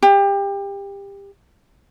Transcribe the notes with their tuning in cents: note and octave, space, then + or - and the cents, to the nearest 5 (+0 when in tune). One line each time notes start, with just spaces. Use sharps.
G4 +25